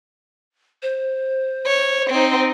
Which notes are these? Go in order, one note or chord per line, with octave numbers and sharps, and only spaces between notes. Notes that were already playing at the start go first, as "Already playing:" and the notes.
C5
C#5
C4 D#4